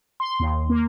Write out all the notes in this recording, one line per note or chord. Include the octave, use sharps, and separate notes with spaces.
C6
D#2
A#3